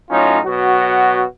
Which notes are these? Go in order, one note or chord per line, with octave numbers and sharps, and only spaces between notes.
A2 F#3 C#4 D#4 F4
B2 F#3 F#4